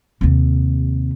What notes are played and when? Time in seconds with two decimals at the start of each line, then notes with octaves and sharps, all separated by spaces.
0.21 D#2 C3